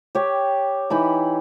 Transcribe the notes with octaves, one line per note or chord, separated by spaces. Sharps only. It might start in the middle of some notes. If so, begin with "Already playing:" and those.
G4 C#5
E3 D#4 B5